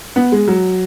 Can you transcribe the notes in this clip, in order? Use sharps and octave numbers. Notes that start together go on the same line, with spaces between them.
B3
G#3
F#3